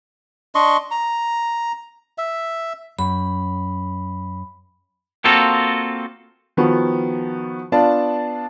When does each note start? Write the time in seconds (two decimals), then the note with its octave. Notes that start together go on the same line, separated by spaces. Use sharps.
0.55 D4 D#5 C6 C#6
0.91 A#5
2.18 E5
2.99 F#2 B5
5.24 A#3 C4 F4 F#4 A4
6.57 D#3 F3 B3 F#4
7.72 B3 D4 F4 D5 F5 A5